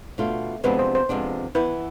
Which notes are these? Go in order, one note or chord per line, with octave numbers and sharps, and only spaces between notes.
B2 A3 D4 F4
F2 C3 G#3 B3 D4 B4
C5
C5
F2 C3 G#3 B3 D4
E3 B3 E4 B4